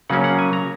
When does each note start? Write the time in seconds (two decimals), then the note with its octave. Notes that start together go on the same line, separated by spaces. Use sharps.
0.09 C#3 F#3 A#3 C#4 F#5
0.24 F#5
0.39 G#5
0.53 A#5